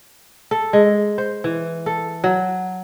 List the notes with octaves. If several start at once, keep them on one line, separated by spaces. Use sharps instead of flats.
A4
G#3
C5
E3
A4
F#3